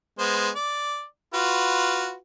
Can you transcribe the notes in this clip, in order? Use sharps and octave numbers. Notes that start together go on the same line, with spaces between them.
G#3 B3 C5
D5
F4 F#4 B4